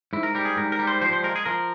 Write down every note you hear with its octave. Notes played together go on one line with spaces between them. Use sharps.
G#2 E4
A#4
G3 A#4
G#4
G#2 A#4
A#4
G3
C5
F3 C5
C5
G#3 A#4
G#4
F3 A#4